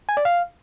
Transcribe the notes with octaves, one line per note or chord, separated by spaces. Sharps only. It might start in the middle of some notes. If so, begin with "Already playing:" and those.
G#5
D5
F5